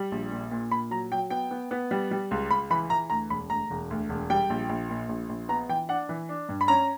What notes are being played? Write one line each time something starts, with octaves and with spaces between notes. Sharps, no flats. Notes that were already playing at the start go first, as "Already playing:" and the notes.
Already playing: G3
A#1
A#2
A#2
A#2 B5
F#3 A#5
F#3 G5
B3 G5
B3
B3
G3
G3
C#2
C#2 B5
E3 B5
E3 A#5
D2 A#5
E1 B5
D2 A#5
E1
D2
E1
G3 G5
A#1
A#1
A#2
A#1
A#1
B3 A#5
E3 G5
D4 F#5
E3
D4
G2
B5
C#4 A#5